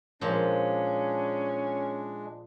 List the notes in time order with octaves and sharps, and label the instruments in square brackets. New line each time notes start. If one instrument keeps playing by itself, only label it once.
[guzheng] A#2 F3 [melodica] G#3 D4 [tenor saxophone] C#4